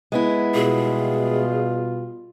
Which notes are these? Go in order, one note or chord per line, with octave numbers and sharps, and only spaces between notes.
G#3 B3 E4
B2 G3 F4 G#4